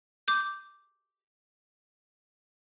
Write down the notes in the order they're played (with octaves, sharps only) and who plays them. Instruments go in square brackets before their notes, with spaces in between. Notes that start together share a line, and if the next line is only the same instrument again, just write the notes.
[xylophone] D6 G6